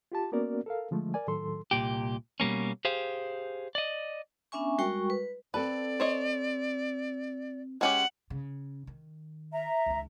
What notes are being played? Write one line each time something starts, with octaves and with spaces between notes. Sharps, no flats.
F4 G4 A5
A#3 B3 C#4 F#4 A#4 D5
A4 A#4 F5
D3 F3 G#3 A3
A#4 D5 G#5
A2 D#3 F#3 A4 C6
C2 A#2 G4
B2 G3 A#3 C#4
G4 G#4 C5 F5
D5 D#5
B3 C#4 D4 E5 G#5 C#6
G3 G#3 F#4 A#4 G5 C#6
B4
C4 A4 B4 D5 A5
C5 C#5 D#5
G#3 C#4 G4 F#5
C#3
D#3
E5 A#5
C#2 D#3